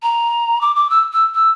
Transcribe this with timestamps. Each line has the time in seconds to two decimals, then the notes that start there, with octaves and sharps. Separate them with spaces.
0.03 A#5
0.61 D6
0.76 D6
0.90 E6
1.13 E6
1.35 E6